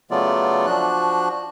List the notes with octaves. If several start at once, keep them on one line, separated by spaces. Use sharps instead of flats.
C#3 F#3 A3 B3 F4 D5
F3 D4 F#4 F#6